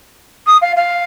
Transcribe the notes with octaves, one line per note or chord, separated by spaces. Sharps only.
D#6
F5
F5